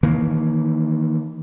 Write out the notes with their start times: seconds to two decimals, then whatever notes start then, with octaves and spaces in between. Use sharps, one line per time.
0.03 D#3 E3 A#3